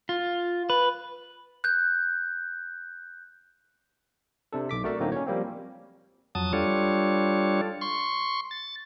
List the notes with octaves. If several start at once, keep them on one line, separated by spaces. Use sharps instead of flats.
F4
B4
F#6 G6
C3 D4 A4
B1 D6 B6
A3 F#4 A#4 D5 E5
A2 D3 F#3 A#3 C4 D#4
C#4 C#5
F3 G3 A#3 C4
F2 F#3 A5 D#6
G3 D4 F4 A4 C#5
C6 C#6
A6